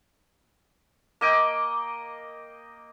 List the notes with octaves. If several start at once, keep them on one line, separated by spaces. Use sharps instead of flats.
A#3 D#5 G5